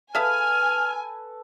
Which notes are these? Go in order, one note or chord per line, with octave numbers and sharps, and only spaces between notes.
G#4 A4 B4 C#5 E5 F5 G#5 F6